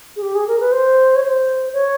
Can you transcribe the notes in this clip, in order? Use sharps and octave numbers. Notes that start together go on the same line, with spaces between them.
G#4
G4
G#4
A#4
B4
C5
C#5
C5
C#5